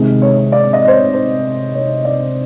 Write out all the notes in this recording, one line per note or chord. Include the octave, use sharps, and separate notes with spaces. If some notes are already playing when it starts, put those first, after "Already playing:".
Already playing: C3 D#3 G#3
C#5
D5
D#5
C5
C#5
C5
C#5
D5